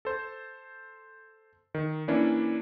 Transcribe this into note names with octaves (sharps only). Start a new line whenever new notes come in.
A4 C5
D#3
E3 A#3 C#4 D4 E4